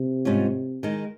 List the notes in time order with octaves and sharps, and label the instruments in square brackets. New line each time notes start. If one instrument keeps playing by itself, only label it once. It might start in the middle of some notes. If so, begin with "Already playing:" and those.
Already playing: [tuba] C3
[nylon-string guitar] G#2 G3 C#4 F4
D#3 G#3 D#4